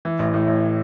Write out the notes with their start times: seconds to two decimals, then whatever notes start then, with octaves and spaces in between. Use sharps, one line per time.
0.05 E3
0.19 A1
0.34 A2
0.48 A1